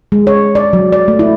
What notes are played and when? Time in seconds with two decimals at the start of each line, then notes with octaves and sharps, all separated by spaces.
0.12 G#3
0.27 C#5
0.55 D5
0.73 F#3
0.92 D5
1.08 A3
1.19 E4